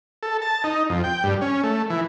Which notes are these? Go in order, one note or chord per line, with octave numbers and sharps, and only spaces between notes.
A4
A5
D#4
F2
G5
G2
C#4
A3
E3